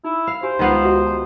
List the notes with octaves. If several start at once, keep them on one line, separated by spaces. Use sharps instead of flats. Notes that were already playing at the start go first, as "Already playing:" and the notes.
D#4 E4
F5 B5
G4 C5 G#5
C#2 D#3 B3 F5
F#4 G4 E5
A5